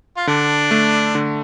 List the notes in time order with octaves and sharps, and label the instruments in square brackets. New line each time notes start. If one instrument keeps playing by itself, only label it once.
[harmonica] F4
[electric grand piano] D3 [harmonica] D4
[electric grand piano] A3
D3